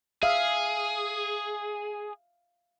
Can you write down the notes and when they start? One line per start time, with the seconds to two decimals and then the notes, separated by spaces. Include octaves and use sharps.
0.23 G#4 E5 F5